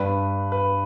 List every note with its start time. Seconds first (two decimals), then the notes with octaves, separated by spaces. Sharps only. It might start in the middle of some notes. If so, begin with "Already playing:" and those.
Already playing: G2 G3 D4 B4
0.52 B4